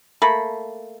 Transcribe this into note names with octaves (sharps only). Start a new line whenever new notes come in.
A3 A#3 B5